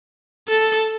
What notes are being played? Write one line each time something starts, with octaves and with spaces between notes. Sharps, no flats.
A4